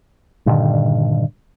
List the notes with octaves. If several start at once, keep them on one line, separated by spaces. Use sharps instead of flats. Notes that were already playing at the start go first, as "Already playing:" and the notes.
G2 A#2 D3 D#3